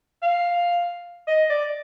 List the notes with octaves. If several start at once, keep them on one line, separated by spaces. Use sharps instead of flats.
F5
D#5
D5